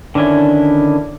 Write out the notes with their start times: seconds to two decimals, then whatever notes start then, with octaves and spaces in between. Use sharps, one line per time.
0.15 D3 D#3 C#4 D4 E4